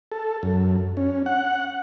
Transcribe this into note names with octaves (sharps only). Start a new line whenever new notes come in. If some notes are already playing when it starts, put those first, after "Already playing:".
A4
F#2
C#4
F#5